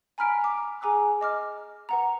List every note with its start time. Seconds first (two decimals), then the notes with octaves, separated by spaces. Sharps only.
0.18 G#5 A#5 B5 F6 B6 D7
0.42 A#5 D6
0.81 G#4 G#5 A#5 D6 E6 F#6
1.21 D#5 D6 F6
1.89 B4 F#5 A#5